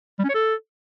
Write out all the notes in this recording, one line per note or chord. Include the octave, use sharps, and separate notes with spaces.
G3
C#4
C#5
A4